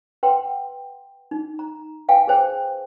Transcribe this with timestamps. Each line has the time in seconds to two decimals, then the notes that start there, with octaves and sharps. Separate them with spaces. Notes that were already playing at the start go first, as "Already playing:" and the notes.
0.23 B4 F#5 G5 C6
1.31 D#4
1.59 A#5
2.08 B4 F5 G5 G#5
2.27 G#4 B4 C5 G5